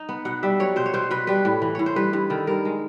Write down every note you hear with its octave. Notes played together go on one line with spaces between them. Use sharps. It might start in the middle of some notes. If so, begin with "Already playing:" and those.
Already playing: D#4
B3
B2 F#5
G3 E5
F#3 C#5
B2 C5
C#5
B2 C5
B2 B4
G3 B4
A2
E3
A2 C#5
C5
G2 B4
G2
D#3 A4
G2 A#4
G#3